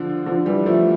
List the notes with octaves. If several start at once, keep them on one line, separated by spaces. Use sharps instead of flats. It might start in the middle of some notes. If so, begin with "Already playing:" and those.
Already playing: D3 F3
D3 F3
E3 G3
F3 A3